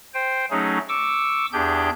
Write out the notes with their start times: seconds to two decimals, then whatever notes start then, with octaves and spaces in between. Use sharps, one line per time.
0.14 C5 G5
0.51 F#3 A3 C#4 D#4 G#4
0.89 C#6 D6 E6
1.53 E2 D4 G4 G#4 G6